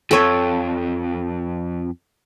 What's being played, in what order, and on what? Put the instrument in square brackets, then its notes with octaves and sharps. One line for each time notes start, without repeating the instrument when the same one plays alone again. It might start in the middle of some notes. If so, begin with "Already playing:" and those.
[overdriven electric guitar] F2 [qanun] A4 C#5